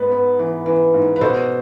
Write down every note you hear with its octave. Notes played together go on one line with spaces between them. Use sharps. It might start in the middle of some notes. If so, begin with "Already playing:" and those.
Already playing: G#2 B3 B4
B3
E3
E3
G#2
B4
B2 A4 C5